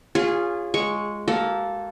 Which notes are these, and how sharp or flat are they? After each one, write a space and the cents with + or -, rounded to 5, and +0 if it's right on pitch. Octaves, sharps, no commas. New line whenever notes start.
C#4 +0 F4 +0 G#4 -25
G#3 +0 C#6 +0
A#3 +0 F#4 +40 A4 -5